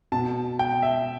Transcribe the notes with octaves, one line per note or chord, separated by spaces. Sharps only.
B2 A5
G5
E5